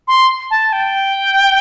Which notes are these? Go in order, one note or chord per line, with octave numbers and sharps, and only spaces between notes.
C6
A5
G5